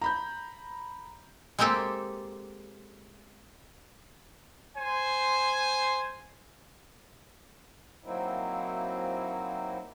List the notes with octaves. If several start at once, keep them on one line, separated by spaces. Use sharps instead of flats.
A#5 B5 G6
G#3 A#3 C4 G4 A4
C5 G#5
F#3 A#3 C4 D#4 E4